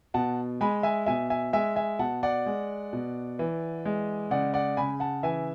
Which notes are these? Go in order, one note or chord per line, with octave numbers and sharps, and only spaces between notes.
B2 F#5 A5
G#3 G#5 B5
E5 G#5
B2 E5 G#5
E5 G#5
G#3 E5 G#5
E5 G#5
B2 F#5 A5
D5 F#5
G#3
B2
E3
G#3
C#3 D5 F#5
D5 F#5
C#3 G#5 B5
F#5 A5
E3 E5 G#5